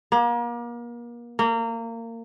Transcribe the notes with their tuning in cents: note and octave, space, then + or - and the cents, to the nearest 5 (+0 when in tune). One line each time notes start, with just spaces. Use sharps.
A#3 +35
A#3 -25